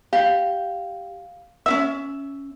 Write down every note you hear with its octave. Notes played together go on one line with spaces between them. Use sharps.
G4 F5
C#4 F4 E5 E6